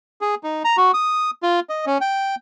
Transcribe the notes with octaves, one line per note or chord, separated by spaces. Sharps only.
G#4
D#4
A#5
F#4
D#6
F4
D#5
C#4
G5